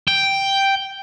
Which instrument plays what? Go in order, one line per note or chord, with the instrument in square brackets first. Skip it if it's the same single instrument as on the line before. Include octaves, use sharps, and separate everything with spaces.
[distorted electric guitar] G5